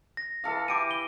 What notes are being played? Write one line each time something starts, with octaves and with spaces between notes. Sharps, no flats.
A#6
E3 A4 F5
E4 G4 D6 D7 D#7
G7